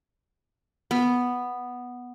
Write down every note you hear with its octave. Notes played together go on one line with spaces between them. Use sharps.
B3